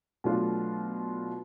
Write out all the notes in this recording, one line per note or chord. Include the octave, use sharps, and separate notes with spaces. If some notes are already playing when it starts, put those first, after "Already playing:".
B2 F#3 A3 D4 F4